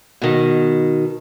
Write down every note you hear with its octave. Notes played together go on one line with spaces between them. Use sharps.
B2 D#3